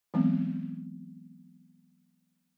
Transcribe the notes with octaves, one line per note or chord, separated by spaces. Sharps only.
E3 F#3 G#3 B3 C4